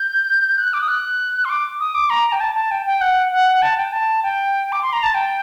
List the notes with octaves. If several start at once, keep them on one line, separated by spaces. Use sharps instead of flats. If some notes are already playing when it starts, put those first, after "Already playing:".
Already playing: G6
F#6
D6
D#6
F#6
C6
D6
D#6
D6
A#5
G5
A5
A5
G5
G5
F#5
F#5
A5
G5
A5
G5
D6
C6
A#5
A5
G5